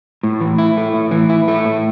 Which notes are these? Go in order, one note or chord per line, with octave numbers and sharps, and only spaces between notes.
A2
E3
E4
A3
A2
E3
E4
A3
A2